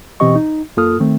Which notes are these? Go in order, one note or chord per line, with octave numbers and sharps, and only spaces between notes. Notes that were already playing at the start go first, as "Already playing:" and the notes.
B2 E3 C4 G4 D#5 C#6
D#4
F#2 A#3 F4 A4 D#6 F6
D#3 A3 C4